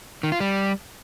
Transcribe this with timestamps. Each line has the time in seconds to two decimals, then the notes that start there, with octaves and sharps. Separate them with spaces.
0.23 D#3
0.32 F4
0.40 G3